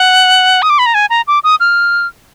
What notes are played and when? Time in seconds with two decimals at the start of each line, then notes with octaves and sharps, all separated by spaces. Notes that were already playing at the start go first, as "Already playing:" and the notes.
Already playing: F#5
0.62 D#6
0.70 D6
0.79 B5
0.86 A#5
0.94 G#5
1.10 A#5
1.28 D6
1.44 D#6
1.60 F6